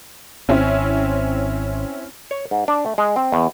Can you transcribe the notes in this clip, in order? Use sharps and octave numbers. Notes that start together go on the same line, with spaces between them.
G#1 C4 C#4 E4
C#5
G#2
D4
A3
G#3
C4
E2